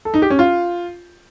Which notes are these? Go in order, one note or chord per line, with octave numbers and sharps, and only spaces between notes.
A4
D#4
G4
C#4
F4